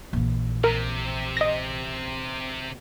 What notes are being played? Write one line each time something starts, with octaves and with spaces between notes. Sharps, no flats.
A#1 E3
C3 A#4
D#5 A#6